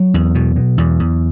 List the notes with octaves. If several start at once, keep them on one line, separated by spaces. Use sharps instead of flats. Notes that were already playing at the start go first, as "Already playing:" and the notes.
Already playing: F#3
E2
B2
B2
E2
E2